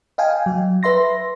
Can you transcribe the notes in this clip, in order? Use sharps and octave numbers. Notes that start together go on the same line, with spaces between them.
D#5 F5 G5 G#5
F#3
B4 E5 C6 A#6